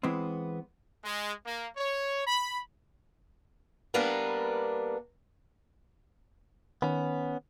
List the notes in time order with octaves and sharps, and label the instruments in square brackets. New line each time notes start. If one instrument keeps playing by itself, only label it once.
[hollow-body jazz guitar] E3 G#3 B3 C4
[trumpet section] G#3
A#3
C#5
B5
[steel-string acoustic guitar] G3 A#3 B3 D4 A#4 B4
[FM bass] D#3 [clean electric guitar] B3 C#4